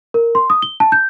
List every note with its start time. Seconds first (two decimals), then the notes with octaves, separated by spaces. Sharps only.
0.14 A#4
0.35 C6
0.50 D#6
0.62 G7
0.80 A5
0.92 G6